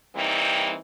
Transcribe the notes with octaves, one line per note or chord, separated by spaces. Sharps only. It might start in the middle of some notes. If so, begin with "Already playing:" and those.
E3 G3 A#3 C4 D#4